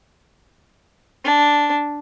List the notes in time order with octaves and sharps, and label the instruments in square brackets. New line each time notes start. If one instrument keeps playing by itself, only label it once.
[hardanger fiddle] D4